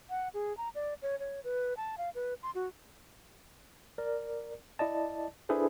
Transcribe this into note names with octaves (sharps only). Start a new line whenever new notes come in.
F#5
G#4
A#5
D5
C#5
C#5
B4
A5
F5
B4
C6
F#4
A#4 D5
E4 D5 D#5 A5
D4 E4 G#4 A4 B4 C5